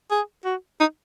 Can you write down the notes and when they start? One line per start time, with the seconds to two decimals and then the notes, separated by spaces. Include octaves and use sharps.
0.11 G#4
0.45 F#4
0.80 D#4